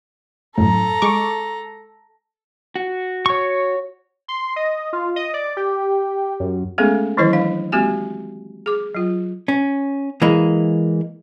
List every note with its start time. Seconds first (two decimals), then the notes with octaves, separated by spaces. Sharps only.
0.58 F#2 A2 A4 A#5
1.02 G#3 C#6 D6
2.76 F#4
3.26 C#5 C#6
4.28 C6
4.56 D#5
4.93 F4
5.16 D#5
5.34 D5
5.57 G4
6.40 F#2
6.78 G#3 A3 B3 C#4 G#4 A4
7.17 D#3 E3 F#3 E4 B4 D#5
7.33 D4 F5
7.72 G#3 A#3 C4 F#4 G4 G#5
8.66 G#4 D6
8.95 F#3 F4
9.48 C#4
10.22 E3 G#3 A#3